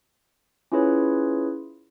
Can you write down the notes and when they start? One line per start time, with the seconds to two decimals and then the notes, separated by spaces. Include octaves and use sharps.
0.72 C#4 E4 F4 G#4 B4 C#5